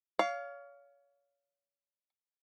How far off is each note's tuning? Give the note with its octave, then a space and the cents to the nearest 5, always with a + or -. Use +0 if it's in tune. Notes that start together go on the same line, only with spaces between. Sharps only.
C#5 +30 F5 +0